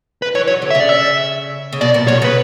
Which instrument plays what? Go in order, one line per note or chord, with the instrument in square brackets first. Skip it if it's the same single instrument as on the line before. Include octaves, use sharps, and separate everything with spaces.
[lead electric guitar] B4
[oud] E3 [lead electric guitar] C#5
[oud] F#3 [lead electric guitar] C#5
[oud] D3
[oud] C#3 [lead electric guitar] E5
[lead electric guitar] D5
E5
[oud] C#3
[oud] B2 [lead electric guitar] D5
[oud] A#2
[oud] B2 [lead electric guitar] C#5
[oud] C#3
[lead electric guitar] B4